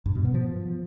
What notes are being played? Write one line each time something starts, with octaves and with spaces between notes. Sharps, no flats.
G2
B2
B3
F3